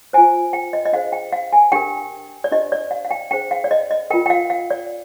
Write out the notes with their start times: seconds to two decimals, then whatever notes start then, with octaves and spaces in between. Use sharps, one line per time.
0.13 F4 C5 G#5
0.53 G5
0.73 D#5
0.85 D#5
0.93 D4 G#4 C5 F5
1.12 G5
1.32 F5
1.53 G#5
1.72 D4 G4 A#4 G5
2.44 D5
2.52 D4 G4 C5 D#5
2.72 D5
2.91 F5
3.05 F5
3.11 G5
3.31 D4 G#4 C5 G5
3.51 F5
3.64 D5
3.71 D#5
3.91 D#5
4.10 F4 A#4 G5
4.26 G5
4.30 F5
4.50 F5
4.71 D5